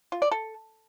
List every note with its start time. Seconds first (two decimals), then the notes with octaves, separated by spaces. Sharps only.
0.12 F4
0.22 D5
0.31 A4